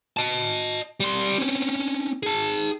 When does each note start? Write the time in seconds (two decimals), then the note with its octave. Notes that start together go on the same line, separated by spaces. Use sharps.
0.17 D#5 A5
1.00 G3 C6
1.38 C4 C#4
2.23 G#4 A5